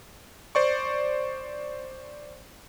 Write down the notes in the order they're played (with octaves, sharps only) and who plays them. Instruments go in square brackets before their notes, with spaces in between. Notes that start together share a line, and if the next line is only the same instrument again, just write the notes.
[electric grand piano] C5 D5 C#6